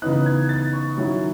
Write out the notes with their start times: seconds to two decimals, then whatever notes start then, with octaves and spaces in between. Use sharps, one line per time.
0.02 C#3 E3 B3 D#4 F#6
0.26 G#6
0.49 A6
0.73 C#6
0.97 D#3 F#3 C#4 E4